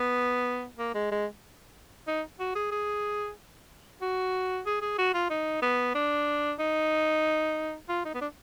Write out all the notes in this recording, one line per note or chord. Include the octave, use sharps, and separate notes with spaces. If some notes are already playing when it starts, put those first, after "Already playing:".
Already playing: B3
A#3
G#3
G#3
D#4
F#4
G#4
G#4
F#4
G#4
G#4
F#4
F4
D#4
B3
D4
D#4
F4
D#4
B3
D4